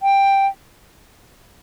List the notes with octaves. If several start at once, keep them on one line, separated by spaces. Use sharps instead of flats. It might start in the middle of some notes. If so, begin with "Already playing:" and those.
G5